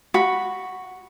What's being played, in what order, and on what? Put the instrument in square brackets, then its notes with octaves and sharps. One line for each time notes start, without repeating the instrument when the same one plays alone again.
[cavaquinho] F#4 B5